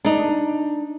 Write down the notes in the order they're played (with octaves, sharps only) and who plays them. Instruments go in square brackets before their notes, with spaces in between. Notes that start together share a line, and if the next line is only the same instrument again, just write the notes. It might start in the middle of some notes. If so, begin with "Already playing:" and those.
[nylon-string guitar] D4 D#4